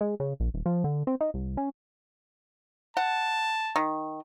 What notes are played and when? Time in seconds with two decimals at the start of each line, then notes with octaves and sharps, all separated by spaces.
0.01 G#3
0.20 C#3
0.40 A#1
0.54 D#1
0.66 F3
0.84 D3
1.07 C4
1.21 D#4
1.34 C2
1.57 C#4
2.97 F#5 A5
3.76 D#3